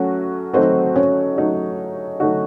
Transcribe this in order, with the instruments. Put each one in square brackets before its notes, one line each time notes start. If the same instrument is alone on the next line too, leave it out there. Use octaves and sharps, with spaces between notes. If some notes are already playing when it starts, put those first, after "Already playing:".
Already playing: [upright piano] F#3 A3 F#4 [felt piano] C#4 C#5
[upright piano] F#3 A3 D#4 F#4 [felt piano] C4 C5
[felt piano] C#4 C#5
[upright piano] F#3 A3 D#4 F#4
F#3 A3 D#4 F#4